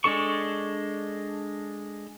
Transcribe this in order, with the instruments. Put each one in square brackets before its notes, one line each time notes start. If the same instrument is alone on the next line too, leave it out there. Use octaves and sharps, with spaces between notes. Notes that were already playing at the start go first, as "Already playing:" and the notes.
[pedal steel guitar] G#3 D4 A4 C#6